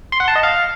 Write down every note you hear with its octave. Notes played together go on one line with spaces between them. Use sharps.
C6
F#5
A5
D#5
F5